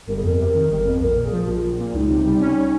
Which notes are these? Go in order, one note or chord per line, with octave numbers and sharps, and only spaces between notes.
G1 A#4
G#4
F2 A#4
C3
D#3
G1
F2
A#1 A#4
A#2
G#4
F3
A#1 F4
A#1
A#2
C#2 D#4
C3
G3
C#4